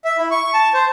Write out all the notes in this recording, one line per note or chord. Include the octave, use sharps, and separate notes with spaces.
E5
E4
C#6
A5
C5